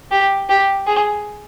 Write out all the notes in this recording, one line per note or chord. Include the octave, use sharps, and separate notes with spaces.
G4
G4
G#4